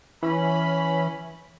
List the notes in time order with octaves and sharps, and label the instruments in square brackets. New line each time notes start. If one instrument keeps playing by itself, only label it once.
[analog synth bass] E3 [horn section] C#4 B5